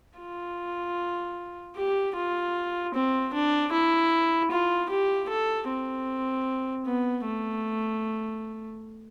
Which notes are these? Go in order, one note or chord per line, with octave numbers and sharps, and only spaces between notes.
F4
G4
F4
C4
D4
E4
F4
G4
A4
C4
B3
A3